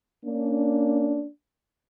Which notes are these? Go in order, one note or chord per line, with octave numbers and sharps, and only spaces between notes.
A#3 C#4 D4